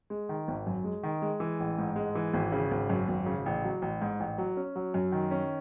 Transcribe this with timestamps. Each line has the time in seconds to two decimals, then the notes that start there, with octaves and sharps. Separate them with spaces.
0.10 G#3
0.29 D#3
0.48 G#1
0.67 F#2
0.84 G#3
1.03 D#3
1.22 G#3
1.40 E3
1.60 A1
1.78 G#2
1.96 G#3
2.15 E3
2.34 G#1
2.52 C#3
2.71 G#1
2.90 F#2
3.08 G#1
3.26 C#3
3.46 A1
3.64 F#3
3.82 A1
4.01 G#2
4.20 A1
4.38 F#3
4.57 C#4
4.76 F#3
4.94 F#2
5.12 D#3
5.31 C#4